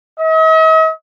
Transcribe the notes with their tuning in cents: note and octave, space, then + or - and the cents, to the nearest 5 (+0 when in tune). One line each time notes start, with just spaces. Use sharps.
D#5 +45